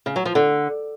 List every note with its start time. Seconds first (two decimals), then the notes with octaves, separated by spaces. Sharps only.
0.06 C#3
0.16 F#3
0.25 F3
0.35 D3